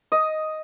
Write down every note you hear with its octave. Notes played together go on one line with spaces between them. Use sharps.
D#5